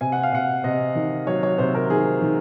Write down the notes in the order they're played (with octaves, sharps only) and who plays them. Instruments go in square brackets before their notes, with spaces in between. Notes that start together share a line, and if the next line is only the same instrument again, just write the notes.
[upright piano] C3 G#5
F#5
F5
C3 F#5
C3 D#5
D#3
F#3 C#5
C#5
C3 C5
A#4
D#3 G#4
D#3